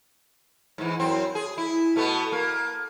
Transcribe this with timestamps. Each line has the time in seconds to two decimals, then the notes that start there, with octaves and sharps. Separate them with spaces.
0.78 G#2 E3
1.00 F#2 C4
1.35 G#4
1.58 E4
1.96 B2 A3 B3
2.32 A#3